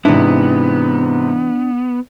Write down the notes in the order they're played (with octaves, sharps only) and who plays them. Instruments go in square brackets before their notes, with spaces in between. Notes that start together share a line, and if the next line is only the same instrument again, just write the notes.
[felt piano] G#2 C3 [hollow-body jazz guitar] E3 E4 [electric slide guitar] B3 [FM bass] D4